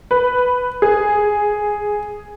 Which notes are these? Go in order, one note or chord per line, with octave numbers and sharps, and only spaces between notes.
B4
G#4